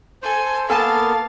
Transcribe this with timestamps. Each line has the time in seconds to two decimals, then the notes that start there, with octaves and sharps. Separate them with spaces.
0.22 A4 C5 G#5
0.70 A#3 B3 A4 A#4 F5 G#5 A5 A6